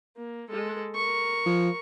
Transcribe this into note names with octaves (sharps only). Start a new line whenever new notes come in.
A#3
G#3 A4
A#4 C#6
F3